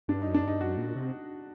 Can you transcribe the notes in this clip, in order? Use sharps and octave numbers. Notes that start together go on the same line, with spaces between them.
G2 D4
F#2 D#4
D4
G2 D#4
F#2 F#4
A#2
C3